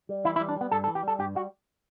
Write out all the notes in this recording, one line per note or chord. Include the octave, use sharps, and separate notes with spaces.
G3
E3 E4
E4
G3
D4
G3 B3
G2 A4
A4
E3
G4
G3 A4
G2 G4
G3 F#4